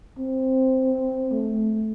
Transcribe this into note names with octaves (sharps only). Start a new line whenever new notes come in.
C4
A3